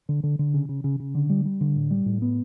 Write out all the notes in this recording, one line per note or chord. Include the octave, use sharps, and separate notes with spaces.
D3
D3
D3
C#3
C#3
C#3
C#3
D3
G3
G3
D3
A2
G3
A2
B3